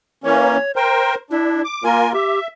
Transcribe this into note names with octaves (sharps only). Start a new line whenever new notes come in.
E3 A#3 C#4 C#5
A#4 C5 G5
D4 E4
D6
A#3 F4 A#4 G#5
G4 E5